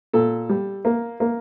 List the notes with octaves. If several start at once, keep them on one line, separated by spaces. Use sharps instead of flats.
A#2 A4
G3
A#3
A#3